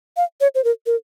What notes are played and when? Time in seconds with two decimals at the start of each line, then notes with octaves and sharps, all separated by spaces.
0.17 F5
0.41 C#5
0.55 C5
0.64 A#4
0.86 A#4